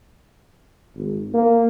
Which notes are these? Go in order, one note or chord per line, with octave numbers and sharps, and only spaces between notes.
G#1
A#3